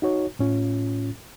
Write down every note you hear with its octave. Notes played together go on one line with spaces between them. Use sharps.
D#4 F#4 C#5
A2 C#4 F4